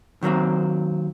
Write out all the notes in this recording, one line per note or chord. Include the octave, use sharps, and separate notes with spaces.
D#3 F#3 A#3 C4